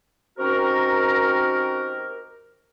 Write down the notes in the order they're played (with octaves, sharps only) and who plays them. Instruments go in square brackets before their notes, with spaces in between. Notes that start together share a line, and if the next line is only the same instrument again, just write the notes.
[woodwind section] D#3 C4 C#4 F#4 G4 A#4